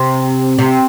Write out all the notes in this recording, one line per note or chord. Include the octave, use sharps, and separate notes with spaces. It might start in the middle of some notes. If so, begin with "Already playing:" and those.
Already playing: C3
C3